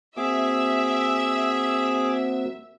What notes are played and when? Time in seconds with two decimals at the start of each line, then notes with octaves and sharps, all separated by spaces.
0.17 A#3 C4 F#4 G#4 E5 D6